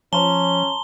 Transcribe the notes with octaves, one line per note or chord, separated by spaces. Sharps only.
F3 C#4 A5 A#5 C6 G7